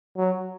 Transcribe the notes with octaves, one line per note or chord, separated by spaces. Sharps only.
F#3